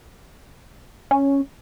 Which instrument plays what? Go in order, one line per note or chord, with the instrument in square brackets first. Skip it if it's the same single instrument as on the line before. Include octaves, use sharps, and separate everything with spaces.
[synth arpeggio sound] C#4